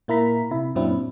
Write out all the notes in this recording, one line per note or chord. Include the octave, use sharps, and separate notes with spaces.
A#2 A#3 E4 A#4 A#5 B6
C3 E4
F#2 A#2 F#3 C4 D4 E4